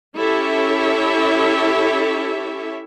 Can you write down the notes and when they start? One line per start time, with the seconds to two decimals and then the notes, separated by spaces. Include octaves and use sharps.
0.18 C#4 E4 G4 A4 C#5 E5